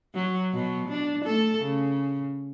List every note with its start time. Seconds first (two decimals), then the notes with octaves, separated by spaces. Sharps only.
0.15 F#3
0.54 B2 F#3
0.88 D4
1.24 A3 A4
1.62 C#3